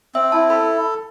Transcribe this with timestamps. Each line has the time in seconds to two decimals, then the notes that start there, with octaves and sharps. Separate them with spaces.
0.15 C4 E5
0.32 E4 A5
0.50 A4 B5